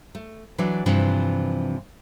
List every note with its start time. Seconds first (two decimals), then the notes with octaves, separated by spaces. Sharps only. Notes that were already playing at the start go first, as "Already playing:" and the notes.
0.15 A3
0.58 E3 F#3 D4 B4 D5
0.86 G2 C3 E3 F3 C4 D4